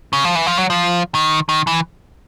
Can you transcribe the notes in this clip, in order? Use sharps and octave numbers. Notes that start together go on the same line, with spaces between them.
C#3
F3
E3
F3
F#3
F3
D#3
D#3
E3